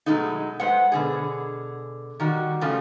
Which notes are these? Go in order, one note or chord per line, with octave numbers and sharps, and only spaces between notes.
B2 F#3 G#3 A3 D#4
G#3 B4 C5 F#5
B2 D3 G#4
D#3 G3 F#4
C#3 F3 G3 A3 F4